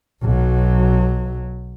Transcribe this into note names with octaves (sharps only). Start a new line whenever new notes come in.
B1 F#3